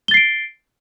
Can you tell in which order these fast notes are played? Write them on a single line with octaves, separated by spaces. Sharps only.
G7 A6 C7 D7